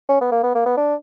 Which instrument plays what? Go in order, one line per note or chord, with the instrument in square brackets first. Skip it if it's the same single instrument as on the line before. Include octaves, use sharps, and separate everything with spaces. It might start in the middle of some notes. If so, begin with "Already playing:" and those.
[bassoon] C#4
B3
A#3
B3
A#3
B3
D4